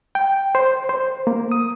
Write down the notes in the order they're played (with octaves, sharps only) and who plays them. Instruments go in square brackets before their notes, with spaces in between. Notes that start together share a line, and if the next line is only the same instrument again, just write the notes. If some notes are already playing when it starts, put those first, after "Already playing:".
[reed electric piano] G5
C5
C5
A#3
D#6